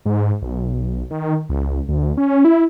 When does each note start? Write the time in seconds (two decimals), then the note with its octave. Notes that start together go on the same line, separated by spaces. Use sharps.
0.06 G#2
0.42 B1
1.10 D#3
1.49 C#2
1.88 D2
2.17 C#4
2.45 E4